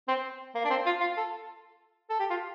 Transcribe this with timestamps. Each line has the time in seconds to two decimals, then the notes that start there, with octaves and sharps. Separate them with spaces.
0.08 C4
0.55 A#3
0.64 D4
0.70 C4
0.86 F4
1.00 F4
1.17 A4
2.10 A4
2.20 G4
2.30 F4